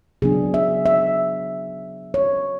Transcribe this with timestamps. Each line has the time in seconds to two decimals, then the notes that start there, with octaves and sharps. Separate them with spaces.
0.22 C#3 F#3 B3 D4 G#4
0.54 E5
0.86 E5
2.14 C#5